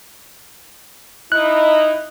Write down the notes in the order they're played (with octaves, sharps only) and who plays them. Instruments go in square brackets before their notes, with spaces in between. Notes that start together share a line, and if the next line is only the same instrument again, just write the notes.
[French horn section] D#4 E4 [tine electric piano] F#6